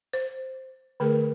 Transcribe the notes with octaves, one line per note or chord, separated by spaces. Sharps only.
C5
D3 A3 G#4 A#4